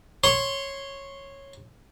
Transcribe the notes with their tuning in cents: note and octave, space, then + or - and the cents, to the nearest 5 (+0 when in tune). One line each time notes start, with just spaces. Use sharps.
C#5 -10 C6 +0